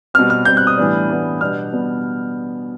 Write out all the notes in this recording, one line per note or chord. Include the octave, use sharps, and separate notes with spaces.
B2 G3 C4 F6
F6
B2 G3 C4 G6
F#6
D#6
A2 E3 G3 B3 D4
A2 E3 G3 B3 D4
B2 G3 B3 D4 F6
B2 G3 B3 D4